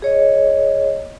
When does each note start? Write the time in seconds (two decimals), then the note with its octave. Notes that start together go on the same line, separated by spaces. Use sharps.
0.02 G#4 C#5 D#5